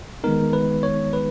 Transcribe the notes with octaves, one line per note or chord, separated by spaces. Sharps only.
D#3 G#3 B3 D#4 A#4
B4
C#5
B4